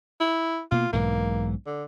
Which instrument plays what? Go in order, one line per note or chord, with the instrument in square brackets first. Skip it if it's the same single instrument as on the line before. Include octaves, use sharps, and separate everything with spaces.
[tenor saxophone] E4
[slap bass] B2 A#3 [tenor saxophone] F4
[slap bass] B1 G#2 E3 [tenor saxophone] A#3
[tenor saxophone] D3